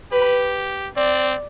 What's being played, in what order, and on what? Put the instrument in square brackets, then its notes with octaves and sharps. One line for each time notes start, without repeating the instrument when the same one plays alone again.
[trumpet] G4 [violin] B4
[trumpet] C4 [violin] D5